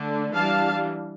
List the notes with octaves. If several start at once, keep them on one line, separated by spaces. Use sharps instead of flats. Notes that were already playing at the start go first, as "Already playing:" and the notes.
Already playing: D3 A3 D4
E3 G3 D4 F5 A5